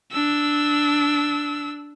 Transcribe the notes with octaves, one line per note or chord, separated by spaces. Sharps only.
D4 E6